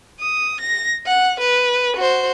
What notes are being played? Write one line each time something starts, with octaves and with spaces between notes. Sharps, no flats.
D#6
A#6
F#5
B4
F#4 C5